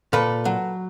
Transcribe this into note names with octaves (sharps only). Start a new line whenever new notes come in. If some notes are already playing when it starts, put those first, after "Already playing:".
A#2 A4 B4
F#3